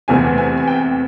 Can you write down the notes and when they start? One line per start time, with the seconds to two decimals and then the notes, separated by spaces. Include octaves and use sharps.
0.08 E2 C3 E3 A3 C4 G#5
0.38 G#5
0.57 G#5
0.68 G5